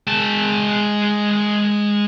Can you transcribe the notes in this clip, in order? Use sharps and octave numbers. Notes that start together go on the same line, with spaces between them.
G#3 A5